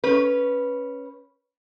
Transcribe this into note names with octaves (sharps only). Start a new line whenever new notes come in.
C#4 B4